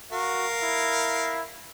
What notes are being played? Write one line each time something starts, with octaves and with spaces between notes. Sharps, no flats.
F#4 A#4 F5
E4